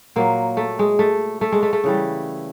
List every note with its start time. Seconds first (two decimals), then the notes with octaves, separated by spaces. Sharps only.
0.16 A#2 F#3 A#3
0.57 A3
0.79 G#3
0.99 A3
1.41 A3
1.52 G#3
1.63 A3
1.73 A3
1.84 C#3 E3 G3